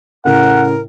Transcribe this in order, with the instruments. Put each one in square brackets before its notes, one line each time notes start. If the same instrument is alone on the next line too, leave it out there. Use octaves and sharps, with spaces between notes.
[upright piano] A2 C#3 [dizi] A#4 [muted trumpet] F#5